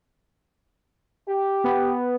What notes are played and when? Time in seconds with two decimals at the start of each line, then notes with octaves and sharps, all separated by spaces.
1.29 G4
1.64 B3